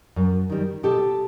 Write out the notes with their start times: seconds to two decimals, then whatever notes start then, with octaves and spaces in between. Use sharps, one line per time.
0.16 F#2
0.50 D#3 G3
0.83 B2 G4 A4